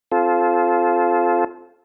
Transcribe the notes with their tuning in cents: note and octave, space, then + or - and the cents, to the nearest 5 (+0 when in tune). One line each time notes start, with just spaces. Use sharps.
C4 +0 F4 +0 A4 -25